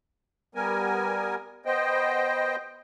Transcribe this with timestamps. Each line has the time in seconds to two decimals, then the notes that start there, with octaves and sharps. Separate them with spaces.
0.55 G3 B3 A#4 G#5
1.65 B3 C5 D#5 G5